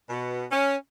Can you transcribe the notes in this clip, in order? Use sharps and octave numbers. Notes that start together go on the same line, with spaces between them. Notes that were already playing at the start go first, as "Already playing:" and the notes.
B2
C#4